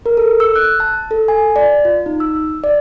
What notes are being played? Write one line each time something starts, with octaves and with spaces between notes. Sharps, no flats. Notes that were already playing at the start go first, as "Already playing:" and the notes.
A#4
A4
E6
F#6
A5
A4
G#5
D5
F4
D#4
E6
D5